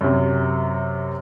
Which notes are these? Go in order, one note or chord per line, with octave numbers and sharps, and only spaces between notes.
F#2 C3